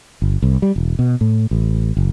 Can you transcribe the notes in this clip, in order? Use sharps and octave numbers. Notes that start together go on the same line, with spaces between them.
G1
C2
G3
E1
B2
A2
A1
F#1